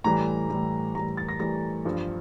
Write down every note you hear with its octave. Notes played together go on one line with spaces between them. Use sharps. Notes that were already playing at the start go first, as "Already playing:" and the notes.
A2 E3 G3 A#5
A2 E3 G3
A2 E3 G3 A#5
A6
A#6
A2 E3 G3 A#6
G2 F3